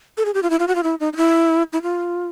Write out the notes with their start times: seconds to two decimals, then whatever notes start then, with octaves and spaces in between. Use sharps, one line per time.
0.17 A4
0.25 G#4
0.34 G4
0.43 F4
0.50 E4
0.59 F4
0.68 F#4
0.75 F4
0.83 E4
1.00 D#4
1.13 D#4
1.17 E4
1.73 E4
1.82 F4